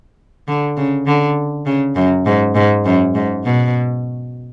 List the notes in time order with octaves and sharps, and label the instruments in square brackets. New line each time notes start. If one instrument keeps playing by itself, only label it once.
[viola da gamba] D3
C#3
D3
C#3
F#2
G#2
G#2
F#2
G#2
B2